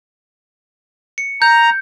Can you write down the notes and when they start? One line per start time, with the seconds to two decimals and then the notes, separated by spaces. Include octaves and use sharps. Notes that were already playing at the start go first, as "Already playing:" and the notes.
1.18 C#7
1.42 A#5 G6